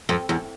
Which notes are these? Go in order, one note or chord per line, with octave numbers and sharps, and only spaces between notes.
F2
E2